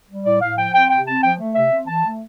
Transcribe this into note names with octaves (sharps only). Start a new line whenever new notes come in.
G3
A2 D5
A2 F5
F3 G5
C4 G5
C3 G5
C4 A5
F3 G5
A3
C3 E5
C4
E3 A5
A3